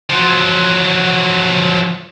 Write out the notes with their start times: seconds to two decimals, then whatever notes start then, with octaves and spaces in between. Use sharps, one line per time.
0.10 F3 F#3